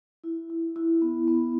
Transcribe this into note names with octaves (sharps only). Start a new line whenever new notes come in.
E4
E4
E4
B3
B3